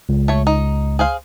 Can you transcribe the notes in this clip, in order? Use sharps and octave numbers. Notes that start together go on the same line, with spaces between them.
C#2
A3 C#5
D#4
G#4 C5 F5